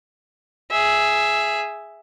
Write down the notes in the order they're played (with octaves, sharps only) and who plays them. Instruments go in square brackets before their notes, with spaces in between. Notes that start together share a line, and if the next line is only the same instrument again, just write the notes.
[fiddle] G#4 E5